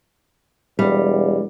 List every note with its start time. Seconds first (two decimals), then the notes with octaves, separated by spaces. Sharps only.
0.79 E1 G3